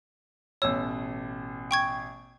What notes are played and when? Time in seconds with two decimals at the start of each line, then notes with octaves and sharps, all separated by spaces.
0.62 A1 B2 C#5 E6
1.71 G5 C#6 G#6